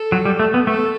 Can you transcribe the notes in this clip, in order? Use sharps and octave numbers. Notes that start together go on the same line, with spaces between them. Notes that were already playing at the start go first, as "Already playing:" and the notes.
Already playing: A4
F#3
G3
A3
B3
A3 A4